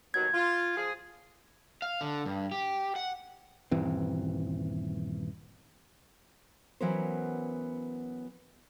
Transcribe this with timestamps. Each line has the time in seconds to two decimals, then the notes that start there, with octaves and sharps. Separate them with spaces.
0.14 D#2 B2 F#3 G#6
0.33 F4
0.77 F3 F4 G#4
1.82 F5
2.01 D3
2.26 G2
2.52 G4
2.96 F#5
3.71 D#1 G2 E3 C4
6.81 E3 F#3 B3 C#4 A#4 C5